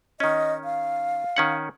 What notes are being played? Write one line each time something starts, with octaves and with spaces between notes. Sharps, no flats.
D#3 C#4 D#5
F5
D#3 C#4 F#5